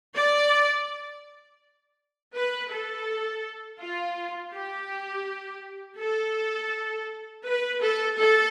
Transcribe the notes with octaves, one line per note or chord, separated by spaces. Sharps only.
D5
B4
A4
F4
G4
A4
B4
A4
A4